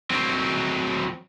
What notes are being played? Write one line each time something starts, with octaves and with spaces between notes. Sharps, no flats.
F#3 C4